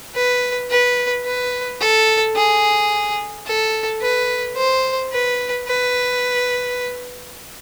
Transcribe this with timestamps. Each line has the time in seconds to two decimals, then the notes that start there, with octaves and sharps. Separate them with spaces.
0.15 B4
0.70 B4
1.25 B4
1.81 A4
2.36 G#4
3.46 A4
4.02 B4
4.57 C5
5.12 B4
5.67 B4